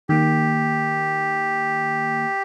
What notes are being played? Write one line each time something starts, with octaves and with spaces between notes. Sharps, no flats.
D#3 A#3 G4